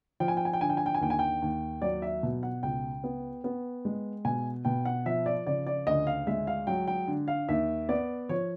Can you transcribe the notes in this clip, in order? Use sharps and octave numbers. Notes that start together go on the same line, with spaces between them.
F3 G5
G#5
G5
G#5
G5
D3 G#5
G5
G#5
G5
G#5
D#2 G5
G#5
G5
D#2
F#3 D5
E5
B2
F#5
C#2 G5
B3
B3
G#3
B2 G#5
B2 G5
F#5
F3 E5
D5
C#3 D5
D5
D2 D#5
F5
G#3 E5
F5
F#3 G5
G5
D3
F5
D#2 E5
B3 D5
F3 C#5